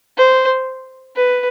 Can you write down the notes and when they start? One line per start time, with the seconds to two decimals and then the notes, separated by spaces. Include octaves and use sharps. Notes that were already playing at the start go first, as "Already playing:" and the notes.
0.17 C5
1.16 B4